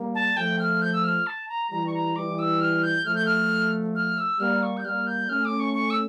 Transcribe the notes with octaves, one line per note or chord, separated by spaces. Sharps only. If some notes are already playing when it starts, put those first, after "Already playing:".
Already playing: G3 A#3
A5
F3 A3 G5
F6
G6
E6
F6
A5
A#5
E3 G3 A#5
C#6
A#5
E3 G3 D6
E6
F6
G6
F3 A3 F6
G6
F6
F6
E6
G3 A#3 F6
C#6
G6
G3 A#3 F6
G6
A3 C#4 F6
D6
C#6
C#6
E6